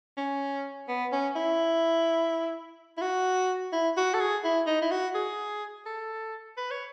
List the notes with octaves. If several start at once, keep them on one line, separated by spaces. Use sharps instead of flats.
C#4
B3
C#4
E4
E4
F#4
E4
F#4
A4
G#4
E4
D#4
E4
F#4
G#4
A4
B4
C#5